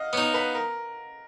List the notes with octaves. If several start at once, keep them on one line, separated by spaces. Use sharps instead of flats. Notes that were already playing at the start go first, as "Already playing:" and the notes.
Already playing: D#5 F5 F#5
B3 D#4 C#5
B4
A#4